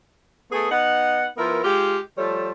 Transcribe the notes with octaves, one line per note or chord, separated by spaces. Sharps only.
A3 B3 G#4
B3 D#4 F#5
F3 B3 E4 A#4
G#3 F4 G4
F3 G3 A3 A4 C#5